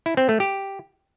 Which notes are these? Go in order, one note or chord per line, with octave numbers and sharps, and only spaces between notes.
E4
C4
A3
G4